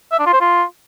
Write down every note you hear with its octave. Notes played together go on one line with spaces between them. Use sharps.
E5
D4
F4
C5
F4